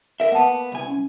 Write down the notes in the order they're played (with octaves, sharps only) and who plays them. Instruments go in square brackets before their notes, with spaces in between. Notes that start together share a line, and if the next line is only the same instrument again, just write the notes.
[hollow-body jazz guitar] A#4 E5
[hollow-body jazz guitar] A#3 B3 [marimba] F#5 A5
[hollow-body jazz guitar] C2 G#5
[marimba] C#4